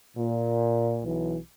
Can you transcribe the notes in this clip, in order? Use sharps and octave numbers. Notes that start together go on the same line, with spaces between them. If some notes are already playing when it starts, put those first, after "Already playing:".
A#2
B1 E3